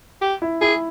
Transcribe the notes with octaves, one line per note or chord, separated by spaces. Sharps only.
G4
E4
E4 G#4